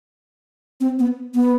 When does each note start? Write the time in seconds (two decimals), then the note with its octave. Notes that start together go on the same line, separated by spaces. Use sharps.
0.81 C4
0.99 B3
1.35 B3